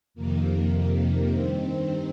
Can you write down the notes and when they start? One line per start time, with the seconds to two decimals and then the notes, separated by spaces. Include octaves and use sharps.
0.14 F2 C3 D#3 A#3
1.31 G2 D#3 C4
1.60 C4